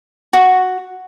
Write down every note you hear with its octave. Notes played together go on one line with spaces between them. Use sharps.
F#4